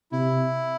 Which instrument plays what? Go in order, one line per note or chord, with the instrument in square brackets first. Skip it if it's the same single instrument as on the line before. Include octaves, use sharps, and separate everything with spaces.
[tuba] C3 [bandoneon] E4